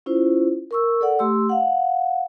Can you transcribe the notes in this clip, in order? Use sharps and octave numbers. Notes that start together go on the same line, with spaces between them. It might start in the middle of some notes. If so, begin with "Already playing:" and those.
C#4 E4 F4 C5
A#4 C#6 E6
A4 D5 F#5
A3 G4 C6 E6
F5 F#5